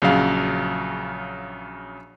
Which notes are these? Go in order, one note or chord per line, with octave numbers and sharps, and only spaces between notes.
A#1 C#3 F#3 F5